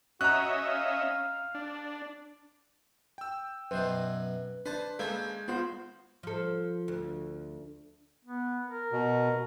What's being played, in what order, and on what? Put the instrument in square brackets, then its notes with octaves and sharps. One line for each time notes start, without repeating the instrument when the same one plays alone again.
[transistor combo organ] C#4 D#5 E5 [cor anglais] F#4 [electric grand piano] A#5 F#6
[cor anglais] F5
[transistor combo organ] D4
[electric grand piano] G5 E6
[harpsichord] F#2 B2 F#3 [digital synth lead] B4 [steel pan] C5
[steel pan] D4 [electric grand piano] B4 [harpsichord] C5 A5
[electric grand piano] G#3 G6 [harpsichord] A#3 C#4 [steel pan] A4 B4 [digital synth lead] G#6
[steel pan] B3 F4 C5 [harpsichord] F#4
[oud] F3 A4
D2
[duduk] B3
A#4
[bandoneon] B2